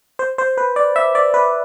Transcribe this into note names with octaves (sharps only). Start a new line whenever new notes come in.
C5
C5
B4
D5
E5
D5
B4